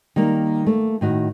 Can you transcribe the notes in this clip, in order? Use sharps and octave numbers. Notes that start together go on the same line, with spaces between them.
D#3 G3 A#3
A3 A#3
A2 D#3 F#4